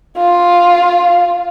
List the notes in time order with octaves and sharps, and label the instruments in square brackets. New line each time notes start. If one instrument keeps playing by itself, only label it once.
[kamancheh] F4